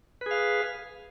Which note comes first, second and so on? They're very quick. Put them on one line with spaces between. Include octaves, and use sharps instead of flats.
B4 G#4 F5